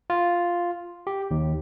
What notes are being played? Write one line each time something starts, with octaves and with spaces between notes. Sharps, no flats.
F4
G4
D#2